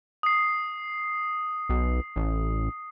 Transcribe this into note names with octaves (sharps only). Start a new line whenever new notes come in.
D#6 C7
B1
A1